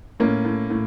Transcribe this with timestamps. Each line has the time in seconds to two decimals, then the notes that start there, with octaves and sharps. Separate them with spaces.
0.20 A2 A#3 C#4
0.45 A2
0.70 A2